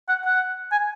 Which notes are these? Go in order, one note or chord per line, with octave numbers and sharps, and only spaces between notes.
F#5
F#5
G#5